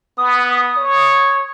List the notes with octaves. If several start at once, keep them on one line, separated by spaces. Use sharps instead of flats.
B3 D#6
C#5